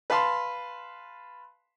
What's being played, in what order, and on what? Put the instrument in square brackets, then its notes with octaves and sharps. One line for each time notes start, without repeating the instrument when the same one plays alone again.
[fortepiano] B4 F5 A5 C6